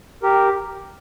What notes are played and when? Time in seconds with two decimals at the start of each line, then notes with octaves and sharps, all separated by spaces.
0.23 G4 A#4